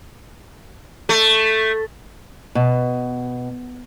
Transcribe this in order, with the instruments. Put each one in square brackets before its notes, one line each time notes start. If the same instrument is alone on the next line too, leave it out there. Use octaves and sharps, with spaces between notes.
[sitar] A3
[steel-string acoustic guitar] B2